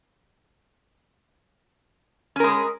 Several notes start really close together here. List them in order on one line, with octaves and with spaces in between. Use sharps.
C#4 A#4 G#3